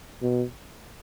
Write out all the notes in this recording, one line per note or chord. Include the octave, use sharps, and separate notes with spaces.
B2